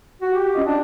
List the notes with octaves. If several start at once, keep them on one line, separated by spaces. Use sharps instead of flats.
F#4
G4
C#4 F4 D#5
D4 G4